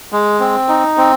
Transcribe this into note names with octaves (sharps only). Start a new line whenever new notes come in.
G#3
C4
D#4
C4